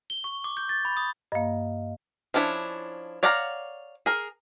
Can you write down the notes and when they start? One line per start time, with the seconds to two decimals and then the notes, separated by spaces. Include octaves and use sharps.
0.10 G7
0.24 C#6
0.44 D6
0.57 G6
0.69 A6
0.85 B5
0.97 D#6
1.32 G2 A#3 D#5 F5
2.34 F3 C#4 D4 E4
3.23 C#5 D5 F5 F#5 A#5
4.06 G#4 A#4